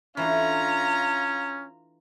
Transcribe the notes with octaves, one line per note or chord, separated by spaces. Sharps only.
E3 A3 C#4 D4 F4 A#5